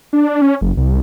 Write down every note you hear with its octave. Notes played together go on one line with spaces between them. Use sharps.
D4
C#4
F#1
C2